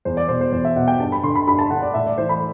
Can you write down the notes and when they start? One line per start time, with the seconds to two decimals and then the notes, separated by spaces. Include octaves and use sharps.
0.05 E2 C5
0.17 D5
0.28 B2 C5
0.41 C5
0.52 E2 C5
0.65 E5
0.76 B2 F#5
0.88 G5
0.99 G2 A5
1.12 B5
1.23 D3 C6
1.35 B5
1.47 G2 B5
1.59 A5
1.70 D3 F#5
1.82 D5
1.94 A2 E5
2.07 D5
2.18 E3 C5
2.29 B5